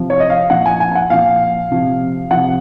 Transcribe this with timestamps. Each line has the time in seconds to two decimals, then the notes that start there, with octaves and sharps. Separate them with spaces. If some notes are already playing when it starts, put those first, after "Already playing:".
Already playing: C3 F3
0.10 C#5
0.20 D#5
0.30 F5
0.50 A#2 F3 F#5
0.66 G#5
0.80 G#5
0.92 G#5
0.95 F#5
1.10 A#2 F3 F5
1.71 C3 F3
2.31 C3 F3 F#5